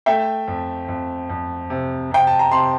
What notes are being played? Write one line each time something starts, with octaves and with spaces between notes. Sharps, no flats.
A3 E5 G5
F2
F2
F2
C3
C3 G5
A5
A#5
C3 A5 C6